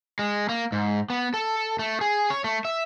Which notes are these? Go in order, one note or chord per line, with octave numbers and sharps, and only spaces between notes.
G#3
A#3
G#2
B3
A4
A3
G#4
C#5
A3
E5